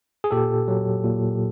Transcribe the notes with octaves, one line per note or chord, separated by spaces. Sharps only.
G#4
A#2 G4 A4
F#3
A#2